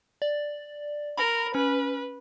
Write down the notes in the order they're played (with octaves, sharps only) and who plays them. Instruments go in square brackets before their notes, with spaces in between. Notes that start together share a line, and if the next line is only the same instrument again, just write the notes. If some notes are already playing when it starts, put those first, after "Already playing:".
[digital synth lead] D5
[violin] A#4 [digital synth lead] B5
[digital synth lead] C#4 [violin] B4